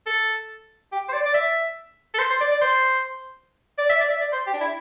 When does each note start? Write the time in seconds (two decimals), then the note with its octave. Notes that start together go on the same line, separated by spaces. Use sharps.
0.06 A4
0.92 G4
1.09 C5
1.13 D5
1.26 D5
1.34 E5
2.14 A4
2.18 C5
2.30 C5
2.41 D5
2.52 D5
2.62 C5
3.78 D5
3.89 E5
4.01 D5
4.10 E5
4.21 D5
4.32 C5
4.47 G4
4.53 D4
4.61 E4